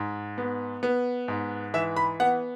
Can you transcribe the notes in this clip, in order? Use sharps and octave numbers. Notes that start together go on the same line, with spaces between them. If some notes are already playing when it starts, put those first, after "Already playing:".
Already playing: G#2
B3
B3
G#2
E3 E5
B5
B3 F#5